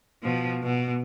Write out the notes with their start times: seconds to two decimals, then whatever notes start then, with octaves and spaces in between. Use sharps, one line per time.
0.23 B2 F3
0.63 B2